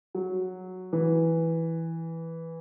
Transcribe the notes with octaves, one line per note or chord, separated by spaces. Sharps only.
F#3
E3